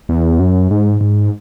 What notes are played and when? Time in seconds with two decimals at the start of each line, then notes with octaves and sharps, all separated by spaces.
0.09 E2
0.40 F#2
0.71 G#2
1.01 G#2